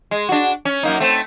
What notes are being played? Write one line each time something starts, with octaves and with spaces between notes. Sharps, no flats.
G#3
D4 F#4
C#4
F#2 A#3 D#4
A3 C4